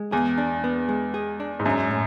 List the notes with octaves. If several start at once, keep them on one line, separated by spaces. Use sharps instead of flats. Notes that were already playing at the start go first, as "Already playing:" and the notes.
Already playing: G#3
E2 G#4
D4
B3
G#3
G#4
D4
G#2
F#2 G#3
A2